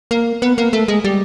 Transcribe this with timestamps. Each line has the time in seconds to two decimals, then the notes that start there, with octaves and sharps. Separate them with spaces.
0.11 A#3
0.42 B3
0.58 A#3
0.73 A3
0.88 G#3
1.04 G3